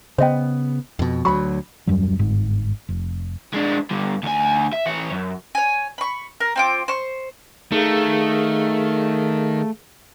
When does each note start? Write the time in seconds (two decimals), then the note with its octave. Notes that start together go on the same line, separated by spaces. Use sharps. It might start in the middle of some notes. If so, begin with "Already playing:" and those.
0.18 C#3 B3 C5 D#5 G5
0.99 F2 B2
1.25 D2 F#3 B5 C#6
1.87 D#1 F#2 F#3 G3
2.19 G1 G#2
2.89 F1
3.54 G#3 D4
3.91 G2 D3
4.23 D2 G#5
4.73 E5
4.86 E3 C#5
5.11 F#2
5.55 C#5 G#5
5.98 B5 C#6
6.40 A#4
6.56 C4 F4 D6
6.88 C5 C#6
7.72 D#3 A3 G#4 A#4 F5